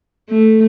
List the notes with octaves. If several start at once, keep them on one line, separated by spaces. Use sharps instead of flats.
A3